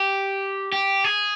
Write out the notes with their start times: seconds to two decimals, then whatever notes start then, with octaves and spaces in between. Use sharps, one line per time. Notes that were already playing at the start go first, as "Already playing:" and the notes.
Already playing: G4
0.72 G4
1.04 G#4